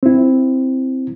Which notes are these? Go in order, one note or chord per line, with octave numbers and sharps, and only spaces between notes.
C4 E4